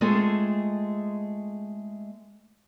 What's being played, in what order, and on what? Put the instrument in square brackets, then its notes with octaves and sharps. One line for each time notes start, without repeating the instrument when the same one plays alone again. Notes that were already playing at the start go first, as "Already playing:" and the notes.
[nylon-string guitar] G#3 A3 C4 F4 G#4 A4